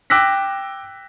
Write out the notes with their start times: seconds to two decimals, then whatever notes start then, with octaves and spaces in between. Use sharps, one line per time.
0.10 G5 D6 E6 F#6 A#6 B6